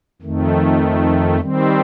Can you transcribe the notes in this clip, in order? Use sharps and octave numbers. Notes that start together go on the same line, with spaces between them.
F2 D#3 A3
D#3 G3 C4